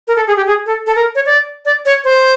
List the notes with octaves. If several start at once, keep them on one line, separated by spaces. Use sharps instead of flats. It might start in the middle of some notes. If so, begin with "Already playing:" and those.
A#4
A4
G#4
G4
G#4
A4
A4
A#4
C#5
D5
D5
C#5
C5